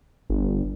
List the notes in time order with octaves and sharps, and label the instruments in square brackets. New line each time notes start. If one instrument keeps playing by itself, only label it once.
[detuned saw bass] G1